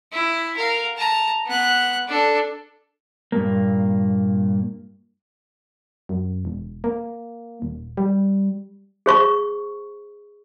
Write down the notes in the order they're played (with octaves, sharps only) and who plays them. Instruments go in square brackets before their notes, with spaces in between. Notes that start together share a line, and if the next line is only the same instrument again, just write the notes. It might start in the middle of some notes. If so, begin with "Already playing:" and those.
[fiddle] E4
A#4 F5
A5 A#5
B3 F#6
D4 A4
[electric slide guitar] G2 A#2 A#3
[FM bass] F#2
E1
A#3
D#1
G3
[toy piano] G#4 C5 C#6